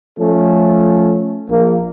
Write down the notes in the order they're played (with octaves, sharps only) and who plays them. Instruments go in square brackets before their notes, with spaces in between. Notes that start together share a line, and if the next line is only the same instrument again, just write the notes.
[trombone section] F3 A3 C#4 A4
A#1 A#3